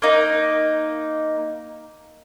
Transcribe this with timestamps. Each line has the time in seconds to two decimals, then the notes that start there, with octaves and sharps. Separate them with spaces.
0.02 A#3 D#4